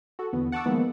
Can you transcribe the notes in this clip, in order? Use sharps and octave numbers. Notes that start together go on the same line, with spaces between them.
F#4 A4
E2 D3 B3
F#5 A5 C#6 D6 E6
D#3 F3 G#3 A#3 B3